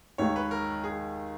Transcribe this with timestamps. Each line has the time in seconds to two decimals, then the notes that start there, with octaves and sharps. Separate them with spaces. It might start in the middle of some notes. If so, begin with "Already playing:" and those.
0.18 D#2 D#3 G#3 C#5
0.36 B4
0.51 A#4
0.84 G#4